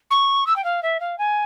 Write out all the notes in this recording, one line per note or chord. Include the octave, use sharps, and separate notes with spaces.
C#6
E6
G5
F5
E5
F5
G#5